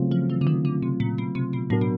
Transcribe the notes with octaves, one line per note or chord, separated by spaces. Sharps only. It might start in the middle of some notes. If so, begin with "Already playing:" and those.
Already playing: C#3 F#3 A3 C4 F4
F3
E3
D3
D#3
D3
C3
A#2
B2
C3
B2
A2 F#3 B3 D4 F#4 A#4
B2